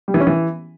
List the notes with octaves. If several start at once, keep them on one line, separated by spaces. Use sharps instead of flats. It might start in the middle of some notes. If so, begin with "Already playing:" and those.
G3
E3
C#4
E3